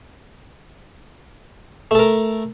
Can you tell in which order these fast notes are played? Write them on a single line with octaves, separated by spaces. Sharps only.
A3 A4 A#4